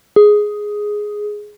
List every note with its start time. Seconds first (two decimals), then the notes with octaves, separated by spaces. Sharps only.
0.16 G#4